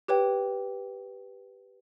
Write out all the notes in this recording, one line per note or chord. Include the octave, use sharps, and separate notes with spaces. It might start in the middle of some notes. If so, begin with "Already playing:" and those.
G4 B4 C#5 G5